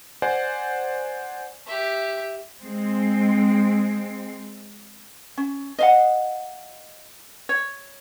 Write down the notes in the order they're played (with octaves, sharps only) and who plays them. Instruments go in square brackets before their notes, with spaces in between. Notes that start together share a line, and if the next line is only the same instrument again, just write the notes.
[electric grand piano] C5 D5 F#5 G#5
[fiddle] G4 E5
[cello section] G#3 C4
[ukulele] C#4
D#5 F5 F#5
C#5